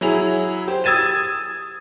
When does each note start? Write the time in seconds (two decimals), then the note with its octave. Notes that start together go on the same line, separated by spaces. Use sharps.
0.01 F#3 E4 G#4 F7
0.68 G4 C5
0.84 D#6 E6 G#6 A6 D#7 E7